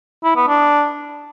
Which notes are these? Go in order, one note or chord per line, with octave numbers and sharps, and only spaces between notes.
E4
B3
D4